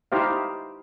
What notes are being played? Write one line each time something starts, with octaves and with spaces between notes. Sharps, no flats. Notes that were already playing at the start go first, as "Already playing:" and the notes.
D#4 E4 G4 C5 F5